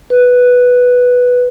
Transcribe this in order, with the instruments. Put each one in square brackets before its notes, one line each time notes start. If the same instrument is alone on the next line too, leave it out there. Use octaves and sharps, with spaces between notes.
[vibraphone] B4